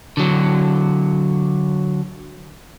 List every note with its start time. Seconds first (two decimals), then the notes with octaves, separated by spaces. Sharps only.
0.17 D3 F#3